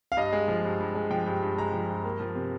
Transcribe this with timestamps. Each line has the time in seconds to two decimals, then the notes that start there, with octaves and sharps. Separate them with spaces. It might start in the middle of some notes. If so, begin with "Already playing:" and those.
0.12 F5
0.17 G2 D#5
0.33 G#3
0.48 F3
0.65 G2
0.80 G2
0.95 G#3
1.11 F3 G5
1.26 G2
1.42 G2
1.58 G#3 A#5
1.73 F3
1.89 G2
2.04 A#3
2.20 F3
2.35 C3